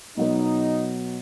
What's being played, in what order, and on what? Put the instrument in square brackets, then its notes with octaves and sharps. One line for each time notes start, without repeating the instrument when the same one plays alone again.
[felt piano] B2 F#3 B3 [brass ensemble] D#4